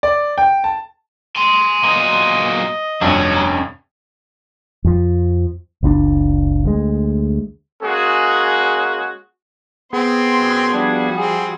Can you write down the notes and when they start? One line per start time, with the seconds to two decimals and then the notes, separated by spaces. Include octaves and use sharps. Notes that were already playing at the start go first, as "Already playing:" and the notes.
0.03 D5
0.38 G5
0.64 A5
1.36 G#5 C6
1.83 A#2 F#3 D#5
3.01 F1 G2 F#3 C#4 D4 E6
4.84 F2 F3
5.83 F#1 C#2 C#4 D4
6.65 D2 G#3
7.83 G#3 A#3 C#4 F#4 G#4
9.93 B3 C4 G#4 C6
10.40 F#2
10.72 F3 G3 D4 F#4
11.18 C4 G#4